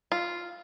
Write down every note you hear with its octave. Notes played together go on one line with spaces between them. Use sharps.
F4